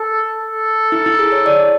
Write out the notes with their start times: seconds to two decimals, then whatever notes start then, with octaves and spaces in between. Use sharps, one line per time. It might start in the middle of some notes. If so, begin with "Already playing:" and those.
Already playing: A4
0.38 A4
0.92 E4
1.06 E4
1.19 G#4
1.32 C#5
1.46 D5